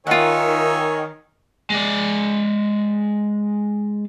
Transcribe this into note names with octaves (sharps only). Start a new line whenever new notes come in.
D#3 F4 C#5 E5 F#5 G#5
G#3 D5